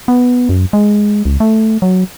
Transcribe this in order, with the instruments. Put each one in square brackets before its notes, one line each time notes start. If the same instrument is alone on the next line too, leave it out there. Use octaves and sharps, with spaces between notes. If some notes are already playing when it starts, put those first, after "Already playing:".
[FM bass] B3
F#2
G#3
C#2
A3
F#3